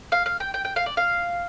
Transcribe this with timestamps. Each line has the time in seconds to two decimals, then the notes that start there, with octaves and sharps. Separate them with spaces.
0.12 F5
0.26 F5
0.40 G5
0.54 G5
0.65 G5
0.76 F5
0.86 D5
0.97 F5